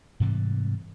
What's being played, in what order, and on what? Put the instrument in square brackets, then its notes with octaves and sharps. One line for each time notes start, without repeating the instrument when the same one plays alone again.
[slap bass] G#2 C3 E3 G3